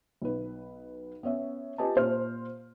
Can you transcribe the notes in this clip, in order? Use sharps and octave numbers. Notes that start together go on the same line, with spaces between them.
B1 B4
B3 C#4 C#5 E5
F4 G4 B4 D#5 G#5 A5
A#2 C5 F6